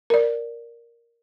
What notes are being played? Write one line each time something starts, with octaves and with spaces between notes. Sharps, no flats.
A#4 D5